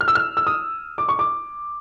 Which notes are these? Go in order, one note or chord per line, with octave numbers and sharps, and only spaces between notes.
F6
E6
F6
E6
D#6
D6
C#6
D6